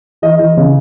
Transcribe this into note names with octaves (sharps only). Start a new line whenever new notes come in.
E3 D#5
E3
C#3